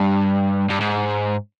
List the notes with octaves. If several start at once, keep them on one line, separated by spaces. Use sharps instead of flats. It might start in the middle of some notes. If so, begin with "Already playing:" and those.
Already playing: G2
G2
G#2